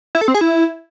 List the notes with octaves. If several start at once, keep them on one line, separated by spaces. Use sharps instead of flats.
E4
A4
C4
G#4
E4